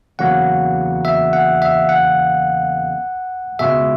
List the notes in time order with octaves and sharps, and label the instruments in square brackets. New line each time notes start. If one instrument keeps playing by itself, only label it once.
[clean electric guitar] E2 C#3 F#3 A#3 [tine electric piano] F#5
[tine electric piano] E5
F#5
E5
F#5
[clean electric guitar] C#2 B2 G#3 [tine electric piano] E5